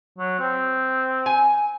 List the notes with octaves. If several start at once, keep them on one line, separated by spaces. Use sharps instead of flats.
F#3
C4
G#5